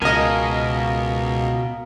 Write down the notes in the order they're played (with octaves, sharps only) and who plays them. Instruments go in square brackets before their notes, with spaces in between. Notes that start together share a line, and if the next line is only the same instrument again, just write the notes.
[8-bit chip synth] C#2 [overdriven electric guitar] B2 [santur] A#4 F5 [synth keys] D#5 G#5